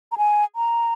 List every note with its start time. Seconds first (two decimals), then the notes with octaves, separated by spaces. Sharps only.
0.12 A#5
0.18 G#5
0.56 A#5